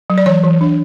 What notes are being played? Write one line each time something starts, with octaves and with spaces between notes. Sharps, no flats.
F#3
D5
E3 C#5
E3
D4